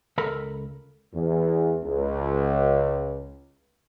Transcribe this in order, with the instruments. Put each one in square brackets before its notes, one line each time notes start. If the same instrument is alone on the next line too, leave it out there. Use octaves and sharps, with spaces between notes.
[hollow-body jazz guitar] C#2 A4 A#4 B5
[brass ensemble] E2
C#2